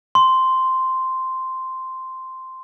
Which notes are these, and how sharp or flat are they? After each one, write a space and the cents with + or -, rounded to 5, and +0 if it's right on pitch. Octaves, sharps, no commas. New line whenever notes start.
C6 -5